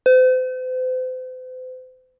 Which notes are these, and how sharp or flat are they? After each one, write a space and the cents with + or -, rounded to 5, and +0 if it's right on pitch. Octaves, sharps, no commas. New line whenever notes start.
C5 -40